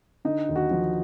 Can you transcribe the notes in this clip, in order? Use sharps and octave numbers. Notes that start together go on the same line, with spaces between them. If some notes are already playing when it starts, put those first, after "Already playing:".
D3 D#4
D#2
F#4
F3